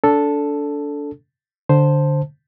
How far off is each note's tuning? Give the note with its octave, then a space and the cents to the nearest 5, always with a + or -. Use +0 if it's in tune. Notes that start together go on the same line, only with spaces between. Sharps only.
D4 -25 A4 +0
D3 +0 C5 +0 A5 +0